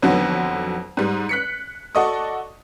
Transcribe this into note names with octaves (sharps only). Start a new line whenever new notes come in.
F2 D3 D#3 F#3 A3 B3
G#2 G3
F#6 B6 C#7
F#4 A4 D5 D#5 C#6 D#6